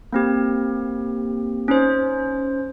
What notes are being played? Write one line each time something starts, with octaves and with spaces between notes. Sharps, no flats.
A#3 C4 G4
C#4 D#4 C5